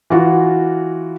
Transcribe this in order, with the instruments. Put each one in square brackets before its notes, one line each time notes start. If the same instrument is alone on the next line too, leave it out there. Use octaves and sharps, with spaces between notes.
[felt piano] E3 F4 F#4